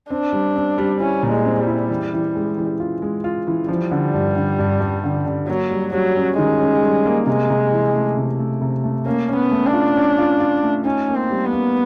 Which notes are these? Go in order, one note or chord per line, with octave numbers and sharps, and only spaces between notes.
C4 D4
G3
C4
G3
C#4 E4
A#2
G#3
C4
G3
E4
E3
E3
G#3
E3
F4
G#3
F4
E3
F3 G3
D3
G2
D3
G2
G2
D3
D3
F#3 A#3
G3
F#3 G3
C#4
D#3 G#3
C#4
G3
A#3
C3 G#3
C3
E3
A3
C3
A3
C3
A3
A#3 C#4
C#4
B3
A3
D4
F4
C#4
F4
F4
A3
C#4 D#4
A#3
C4
G3
B3
A#3